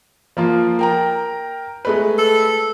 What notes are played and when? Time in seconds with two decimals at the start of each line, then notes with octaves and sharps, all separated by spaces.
0.37 F3 A#3 F4
0.79 A#4 G5 A#5
1.85 G#3 A3 B4
2.18 A4